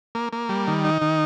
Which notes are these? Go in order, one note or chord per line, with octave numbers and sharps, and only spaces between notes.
A#3
A#3
G3
D#3
D#4
D#3